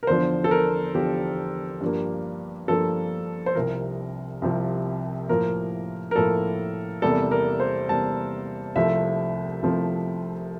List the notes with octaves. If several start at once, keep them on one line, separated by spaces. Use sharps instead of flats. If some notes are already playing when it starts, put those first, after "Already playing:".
A#4
E2 D3 F3 C5
A4
A#4
E2 D3 F3 G4
G2 F3 A#3
G2 F3 A#3 A4
C5
C2 C3 F3 A#4
C2 C3 F3
A2 F3 A#3 A#4
A#4
A2 F3 A#3 A4
E2 C3 G3 A#3 A4
A#4
C5
E2 C3 G3 A#3 A5
C2 C3 F3 A3 E5
C2 C3 F3 A3